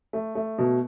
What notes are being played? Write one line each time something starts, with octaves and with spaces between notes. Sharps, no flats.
A3
A3
B2